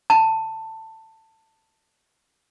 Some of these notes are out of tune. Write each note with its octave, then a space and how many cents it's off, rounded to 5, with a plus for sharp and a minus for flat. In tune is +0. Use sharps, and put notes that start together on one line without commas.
A5 +15